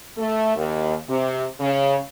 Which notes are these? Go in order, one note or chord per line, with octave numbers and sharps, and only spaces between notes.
A3
D#2
C3
C#3